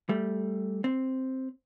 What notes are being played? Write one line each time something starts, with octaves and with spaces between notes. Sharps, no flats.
G3 A3
C4